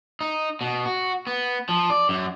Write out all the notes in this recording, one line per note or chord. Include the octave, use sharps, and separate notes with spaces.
D#4
B2
F#4
B3
F3
D5
F#2